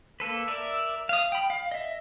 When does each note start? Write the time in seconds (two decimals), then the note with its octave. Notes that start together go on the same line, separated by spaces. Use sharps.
0.20 A#3 A4 B4
0.48 A#4 D5 E5
1.09 F5 D#6
1.32 G5 B5
1.50 F5
1.72 D#5 E5